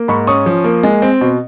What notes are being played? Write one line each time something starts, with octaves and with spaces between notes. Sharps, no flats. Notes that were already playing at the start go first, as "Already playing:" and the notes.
Already playing: A#3
G#2 B5 C#6
C#4 C#6 D#6
F3
A#3
G#3
C4
B2